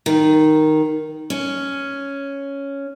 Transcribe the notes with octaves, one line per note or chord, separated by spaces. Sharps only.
D#3
C#4